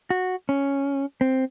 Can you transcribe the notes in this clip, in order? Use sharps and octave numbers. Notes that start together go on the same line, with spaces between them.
F#4
C#4
C4